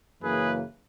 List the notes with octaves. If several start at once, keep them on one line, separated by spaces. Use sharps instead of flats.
F#2 C#3 E3 A#3 G#4 B4